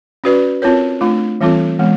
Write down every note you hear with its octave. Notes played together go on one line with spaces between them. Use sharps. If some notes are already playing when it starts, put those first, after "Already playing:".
C#4 F#4 B4 D5
C4 F4 A#4 C#5
A3 D4 F4
E3 G3 C4 F4 A4
E3 G#3 B3